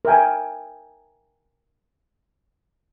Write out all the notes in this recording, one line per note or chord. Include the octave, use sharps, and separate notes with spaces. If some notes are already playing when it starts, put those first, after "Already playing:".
A#4 E5 G5 G#5